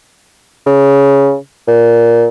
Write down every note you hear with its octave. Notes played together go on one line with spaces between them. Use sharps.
C#3
A#2